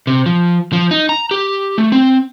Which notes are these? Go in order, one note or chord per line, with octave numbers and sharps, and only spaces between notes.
C3
F3
F3
D#4
A#5
G4
A3
C4